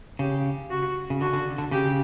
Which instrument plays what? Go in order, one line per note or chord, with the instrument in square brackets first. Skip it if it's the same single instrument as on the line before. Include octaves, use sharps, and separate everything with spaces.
[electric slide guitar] C#3 [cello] G4
[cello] F#4
[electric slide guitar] C#3
[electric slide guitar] D3 [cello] F#4
[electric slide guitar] D3
D3
[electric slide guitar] C#3 [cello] G4